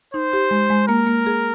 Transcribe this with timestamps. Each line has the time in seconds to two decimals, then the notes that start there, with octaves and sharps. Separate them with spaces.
0.14 D#4 C5
0.33 G4
0.51 G#3
0.70 G#3
0.88 A#3 A#4
1.07 A#3
1.26 G#4